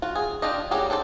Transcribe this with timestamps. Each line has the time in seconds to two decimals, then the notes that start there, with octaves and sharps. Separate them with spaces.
0.02 F4 F#4
0.15 G#4
0.42 D4 F4 G4 D#5
0.71 F#3 G3 A#3 G4 G#4
0.90 D4 A4 C5 D5